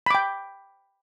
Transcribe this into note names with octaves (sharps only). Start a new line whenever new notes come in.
G5 B5 D6